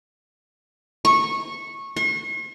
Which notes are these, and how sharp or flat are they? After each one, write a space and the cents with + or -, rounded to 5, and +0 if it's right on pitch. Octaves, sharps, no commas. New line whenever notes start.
C#6 -15
C#6 -45